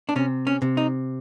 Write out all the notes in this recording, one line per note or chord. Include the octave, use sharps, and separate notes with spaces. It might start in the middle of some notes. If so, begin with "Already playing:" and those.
D4
C3 C#4
C#4
C3
D#4